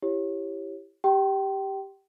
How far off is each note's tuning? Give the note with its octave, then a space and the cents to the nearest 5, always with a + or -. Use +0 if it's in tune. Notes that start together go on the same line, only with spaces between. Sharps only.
E4 +10 G4 +0 C#5 -15
G4 +0 G5 -25 C6 +15